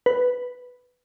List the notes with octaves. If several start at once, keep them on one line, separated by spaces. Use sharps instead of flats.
B4